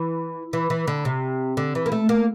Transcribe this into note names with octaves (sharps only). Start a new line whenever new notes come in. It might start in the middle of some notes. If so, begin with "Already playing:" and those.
Already playing: E3
E3
E3
D3
C3
D3
E3
A#3
A3
A#3